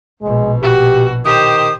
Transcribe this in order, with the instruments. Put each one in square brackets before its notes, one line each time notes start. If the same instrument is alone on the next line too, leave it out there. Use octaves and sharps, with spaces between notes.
[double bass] A#1 B2 [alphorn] G#3
[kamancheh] F#4 [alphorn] G4
[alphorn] D#3 [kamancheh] G4 C5 [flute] D#6